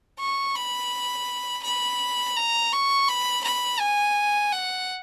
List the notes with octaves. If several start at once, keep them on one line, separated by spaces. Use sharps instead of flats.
C#6
B5
B5
A#5
C#6
B5
B5
G#5
F#5